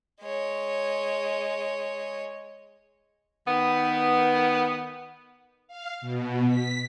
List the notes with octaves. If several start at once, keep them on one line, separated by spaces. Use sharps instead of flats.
G#3 C#5
D#3 B3
F5
B2
B6